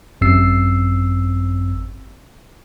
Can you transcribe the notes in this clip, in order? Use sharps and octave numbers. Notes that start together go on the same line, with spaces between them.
G#1 F#2 C4 E6 C7